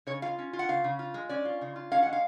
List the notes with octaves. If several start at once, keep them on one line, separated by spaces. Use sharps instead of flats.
C#3 C#5
F4 F5
C#4
F4
F#5
C#3 F5
C#3
F4
G#3
C#4 D5
F4
C#3
F4
C#4 F5
G#3 F#5
F5